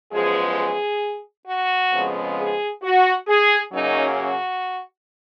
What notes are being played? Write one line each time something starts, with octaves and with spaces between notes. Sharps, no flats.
F#2 F3 G#3 B3 G#4
G#4
F#4
F2 C#3 F3 G#3 B3
G#4
F#4
G#4
F#2 C#3 F#3 A#3 C#4 D#4
F#4